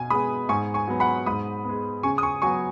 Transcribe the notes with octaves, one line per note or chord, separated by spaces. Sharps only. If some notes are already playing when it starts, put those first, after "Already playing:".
Already playing: B2 G#5
G#3 B3 B5 D#6
G#2 G#5 C#6
G#5 C#6
F#3 B3
F#5 B5
G#2 B5 D#6
G#3 B3
C#3 G#5 C#6
D#6
G#5 C#6
F#3 B3 G#5 C#6